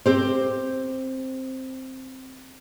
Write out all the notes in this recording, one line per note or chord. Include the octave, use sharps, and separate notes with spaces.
C4 G4 C5